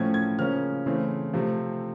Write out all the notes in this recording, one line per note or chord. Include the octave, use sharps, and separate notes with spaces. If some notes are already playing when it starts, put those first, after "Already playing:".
Already playing: A2 F3 A3 C#4 G#6
G#6
C#3 F3 A#3 C#4 F6
C#3 E3 A3 C4
C3 F3 A3 C4